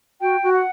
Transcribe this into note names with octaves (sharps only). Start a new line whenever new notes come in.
F#4 G5
F#4
F#5